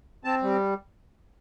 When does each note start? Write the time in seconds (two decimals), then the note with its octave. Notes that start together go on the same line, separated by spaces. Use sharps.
0.24 C4 A5
0.42 G3